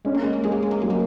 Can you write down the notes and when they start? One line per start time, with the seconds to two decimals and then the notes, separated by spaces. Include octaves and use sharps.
0.05 G#3 C#4
0.14 A#3
0.24 G#3
0.33 A#3
0.43 G#3 G#4
0.52 A#3
0.63 G#3
0.71 A#3
0.81 F#3 G#3
0.90 A#3